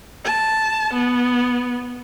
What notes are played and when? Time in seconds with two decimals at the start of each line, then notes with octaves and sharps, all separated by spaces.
0.25 A5
0.93 B3